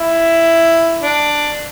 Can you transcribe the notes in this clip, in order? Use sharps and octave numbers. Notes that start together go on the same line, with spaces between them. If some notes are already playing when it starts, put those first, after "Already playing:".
Already playing: E4
D4